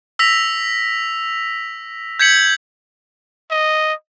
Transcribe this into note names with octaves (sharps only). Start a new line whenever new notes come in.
E6 A#6 B6 F7
G6 G#6 B6 C#7 F#7
D#5